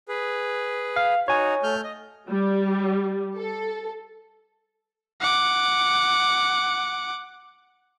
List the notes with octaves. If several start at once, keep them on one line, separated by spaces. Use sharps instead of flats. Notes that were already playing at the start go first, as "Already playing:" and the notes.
G#4 B4
F5
D#4 F#4 C#5 G#5
A3 F6 G6
D#5
G3
A4
F#5 D6